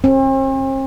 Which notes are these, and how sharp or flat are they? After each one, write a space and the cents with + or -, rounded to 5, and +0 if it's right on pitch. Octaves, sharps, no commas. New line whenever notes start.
C4 +45